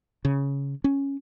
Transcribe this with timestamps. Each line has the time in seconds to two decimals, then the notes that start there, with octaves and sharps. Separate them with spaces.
0.25 C#3
0.84 C#4